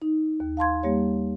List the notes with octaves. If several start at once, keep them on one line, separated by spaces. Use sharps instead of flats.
D#4
D#2
F5 A5 C6 G#6
G3 A#3 G4 C#5